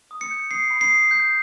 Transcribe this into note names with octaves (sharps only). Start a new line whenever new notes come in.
D#6
C#7
G6
D#6 C7
B5
C7
D#6
G6